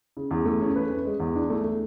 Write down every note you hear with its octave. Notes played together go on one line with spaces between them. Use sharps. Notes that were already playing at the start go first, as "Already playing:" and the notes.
C#3
E2
A3
C#4
B4
C#4
G#3
E2
D4
A3
A3